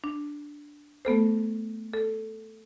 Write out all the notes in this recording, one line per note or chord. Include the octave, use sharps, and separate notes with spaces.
D4
A3 B3 A4 C5
A4